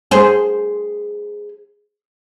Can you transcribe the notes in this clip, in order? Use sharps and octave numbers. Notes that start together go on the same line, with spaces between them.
G#4 C5